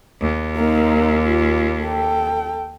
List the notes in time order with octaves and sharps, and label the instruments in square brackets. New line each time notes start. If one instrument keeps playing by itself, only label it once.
[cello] D#2
[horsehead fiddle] A#3 D#4
F4
A4 G5